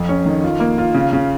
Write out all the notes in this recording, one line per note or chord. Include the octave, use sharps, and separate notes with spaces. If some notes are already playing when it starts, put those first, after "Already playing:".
Already playing: F2
C#4
D#3
F4
A#3
F4
C#3
C#3